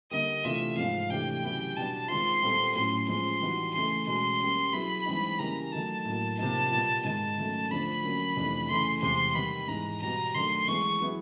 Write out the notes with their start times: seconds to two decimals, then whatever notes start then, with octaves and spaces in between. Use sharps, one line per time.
0.11 D3 G3 A#3 D#5
0.44 C3 E3 A3 D4 F4 E5
0.77 G#2 F3 G#3 F5
1.10 C3 E3 A3 D4 G4 G5
1.43 C#3 F#3 B3 E4 G4
1.76 B2 G3 B3 D4 A5
2.08 D#3 G#3 C4 F4 C6
2.43 A#2 G3 C4 F4 A4
2.75 A2 F#3 A3 C#4 C6
3.08 F3 G#3 C#4 C6
3.41 E3 G3 B3 D#4 F#4
3.74 C#3 E3 A3 C6
4.07 B2 G#3 C#4 C6
4.40 G3 A#3 C#4
4.73 F#3 B3 E4 G#4 B5
5.06 G2 E3 G#3 C4 D#4
5.39 C#3 E3 G3 A#3 A#5
5.72 D#3 F#3 A3 A5
6.05 A2 F#3 A#3
6.38 C3 F3 A#3 D#4 A5
6.71 A#2 G3 B3
7.04 G#2 D#3 G#3 A5
7.38 D#3 F#3 A3 C#4
7.70 D3 F3 A3 D4 B5
8.03 D3 F#3 A#3 C#4
8.37 F2 C3 E3 A3 D4
8.69 C#3 E3 A3 C6
9.02 E2 C3 E3 G#3 C6
9.35 D#3 G3 B3 B5
9.68 G#2 E3 G#3 A#5
10.01 B2 G3 B3 A#5
10.34 D#3 F#3 A3 D4 C6
10.68 E3 G#3 B3 E4 G#4 C#6
11.00 F#3 B3 E4 G#4